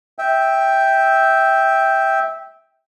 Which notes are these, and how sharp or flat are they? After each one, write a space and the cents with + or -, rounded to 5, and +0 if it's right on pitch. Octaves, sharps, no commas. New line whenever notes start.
E5 -10 G5 +0